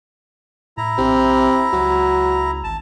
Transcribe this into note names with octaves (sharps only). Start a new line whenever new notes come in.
A2 E4 A#5
A#1 C3
C#2 F#3
G#1 A5